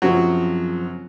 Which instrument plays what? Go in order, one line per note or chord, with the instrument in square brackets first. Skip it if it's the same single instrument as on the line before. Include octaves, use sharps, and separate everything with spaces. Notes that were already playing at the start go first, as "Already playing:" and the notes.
[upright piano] F#2 C#3 F3 C4 [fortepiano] F#3 F#4